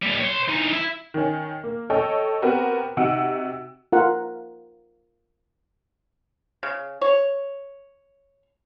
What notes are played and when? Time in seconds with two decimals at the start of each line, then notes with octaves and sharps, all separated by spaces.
0.02 A#2 G3
0.20 C#5 C6
0.48 E3 D#4
0.73 E4
1.14 D#3 C#4
1.64 A#3
1.90 A4 C#5 D#5 G5
2.42 B3 C4 F#4 G4 A#4 B4
2.97 C3 D#4 F#4 F#5 E6 D7
3.92 F4 A#4 F#5
6.63 C#3
7.01 C#5